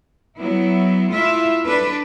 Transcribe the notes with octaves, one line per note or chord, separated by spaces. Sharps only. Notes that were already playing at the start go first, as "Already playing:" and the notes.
F#3 B3 E4
A3 E4 F4 E5
D4 A4 B4